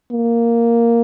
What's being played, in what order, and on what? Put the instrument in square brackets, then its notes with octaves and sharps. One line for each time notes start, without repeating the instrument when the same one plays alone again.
[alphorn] A#3